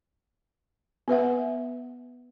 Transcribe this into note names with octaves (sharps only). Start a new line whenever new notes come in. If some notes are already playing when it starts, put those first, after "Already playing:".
B3 B4 E5 F#5